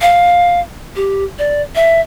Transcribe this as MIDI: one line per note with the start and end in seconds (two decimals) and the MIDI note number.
0.01 0.60 77
0.96 1.24 67
1.39 1.62 74
1.75 2.01 76